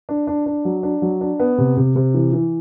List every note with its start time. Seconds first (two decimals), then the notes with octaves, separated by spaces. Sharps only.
0.09 D4
0.27 D4
0.46 D4
0.65 F#3
0.83 D4
1.02 F#3
1.21 D4
1.40 B3
1.58 C3
1.77 C3
1.96 C3
2.14 E3
2.33 E3